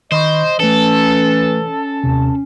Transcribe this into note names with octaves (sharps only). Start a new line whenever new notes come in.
D#3 C5 D#5 B5 C#6
E3 A3 C#4 A4 A6
D#2 C3